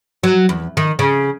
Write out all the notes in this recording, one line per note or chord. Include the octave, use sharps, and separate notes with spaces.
F#3
E2
D#3
C#3